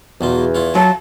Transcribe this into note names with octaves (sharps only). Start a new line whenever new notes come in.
B1 E2 F#3 F4
E4 F4 C#5
F#3 A5